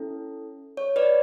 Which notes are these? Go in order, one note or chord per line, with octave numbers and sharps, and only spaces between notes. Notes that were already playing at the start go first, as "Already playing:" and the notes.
Already playing: C#4 E4 A4
C#5
B4 D5